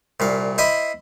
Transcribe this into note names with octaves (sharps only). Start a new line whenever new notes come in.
C2 A#2 F5
E4 C5 D#5 B5 C6